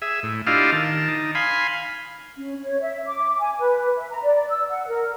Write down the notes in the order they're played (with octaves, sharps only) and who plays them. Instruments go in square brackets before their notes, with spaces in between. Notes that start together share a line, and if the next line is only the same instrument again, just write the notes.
[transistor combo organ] G#4 E5
A2
D4 E4 F4 G4 D#5 F5
D#3 A5
D#4
F5 G#5 B5 C6
[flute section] C#4
C#5
E5
D6
G#5
B4
E5
A#5
D5
E6
F#5
A#4